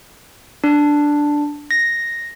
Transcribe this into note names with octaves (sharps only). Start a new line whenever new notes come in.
D4
A#6